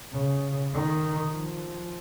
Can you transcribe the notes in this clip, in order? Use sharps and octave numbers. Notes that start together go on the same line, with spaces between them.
C#3
D#3
F3